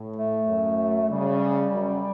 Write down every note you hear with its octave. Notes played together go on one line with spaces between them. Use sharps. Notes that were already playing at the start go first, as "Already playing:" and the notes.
Already playing: A2
A3
F#2
C#3 G3
F#2